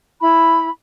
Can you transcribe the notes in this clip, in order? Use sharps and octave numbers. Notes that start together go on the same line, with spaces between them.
E4 B5